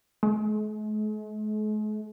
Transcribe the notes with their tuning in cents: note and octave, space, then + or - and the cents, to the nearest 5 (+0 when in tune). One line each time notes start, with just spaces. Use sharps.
G#3 +45